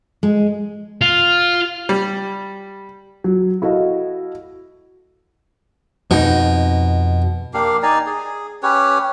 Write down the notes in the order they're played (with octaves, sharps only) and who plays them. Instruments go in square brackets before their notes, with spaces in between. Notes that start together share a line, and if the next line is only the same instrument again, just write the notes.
[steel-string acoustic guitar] G#3
[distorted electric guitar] F4
[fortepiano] G3
[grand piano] F#3
E4 F#4 A4 D#5 F5
[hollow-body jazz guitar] F2 D#4 [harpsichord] B2
[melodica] A#3 D4 G4 F5
D#4 D5 G#5 A#5
G#4
C#4 G4 B4 C#5